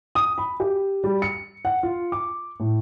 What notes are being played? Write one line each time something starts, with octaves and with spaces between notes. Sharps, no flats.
D#6
B5
G4
G3
C#7
F#5
F4
D6
A2